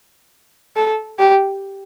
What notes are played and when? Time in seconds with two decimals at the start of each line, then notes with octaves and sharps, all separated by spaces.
0.76 A4
1.19 G4